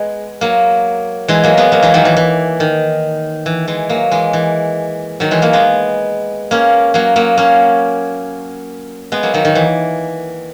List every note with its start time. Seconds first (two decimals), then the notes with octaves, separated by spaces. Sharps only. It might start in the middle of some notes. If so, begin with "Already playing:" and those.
Already playing: G#3 B3
0.41 F#3 A#3
1.28 E3 G#3
1.43 F#3 A#3
1.57 G#3 B3
1.72 F#3 A#3
1.82 E3 G#3
1.94 D#3 F#3
2.05 E3
2.17 E3
2.60 D#3
3.46 E3
3.68 E3 G#3
3.89 F#3 A#3
4.11 E3 G#3
4.33 E3
5.20 D#3 F#3
5.31 E3 G#3
5.42 F#3 A#3
5.53 G#3 B3
6.51 A#3 C#4
6.94 F#3 A#3
7.16 F#3 A#3
7.37 A#3 C#4
9.12 G#3 B3
9.23 F#3 A#3
9.34 D#3 F#3
9.45 D#3
9.55 E3